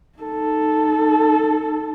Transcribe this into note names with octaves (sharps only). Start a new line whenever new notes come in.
D#4 A4